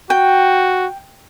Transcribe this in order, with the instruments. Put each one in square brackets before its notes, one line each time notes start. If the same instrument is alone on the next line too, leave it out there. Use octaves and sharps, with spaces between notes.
[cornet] F#4 [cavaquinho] G5